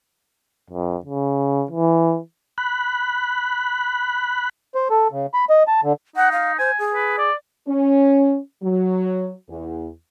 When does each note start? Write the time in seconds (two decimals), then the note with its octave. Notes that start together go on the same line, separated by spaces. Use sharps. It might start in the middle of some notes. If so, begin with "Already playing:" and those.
0.70 F2
1.05 C#3
1.71 E3
2.58 B5 F#6
4.75 C5
4.90 A4
5.12 C#3
5.34 B5
5.50 D#5
5.68 A5
5.83 D3
6.16 D#4 F#5
6.32 F5
6.59 C5 G#5
6.79 G#4
6.94 B4
7.18 D5
7.68 C#4
8.63 F#3
9.49 E2